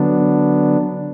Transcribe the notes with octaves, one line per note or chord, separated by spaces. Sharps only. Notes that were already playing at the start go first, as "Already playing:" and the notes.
Already playing: D3 F#3 B3 D4